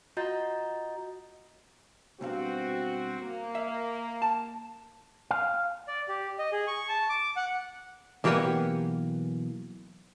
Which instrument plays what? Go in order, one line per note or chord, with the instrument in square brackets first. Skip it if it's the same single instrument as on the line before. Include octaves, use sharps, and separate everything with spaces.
[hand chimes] F4 F#4 D#5 A#5 G6 A6
[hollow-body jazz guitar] B1 G2 F5 [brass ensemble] C4 F#4
[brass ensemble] A#3
[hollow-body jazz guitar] E5
A5
[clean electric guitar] F5
[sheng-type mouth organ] D5
G4
D#5
G#4
C#6
A5
D6
F#5
[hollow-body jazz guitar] B1 E3 A#3 G4 F#5 G#5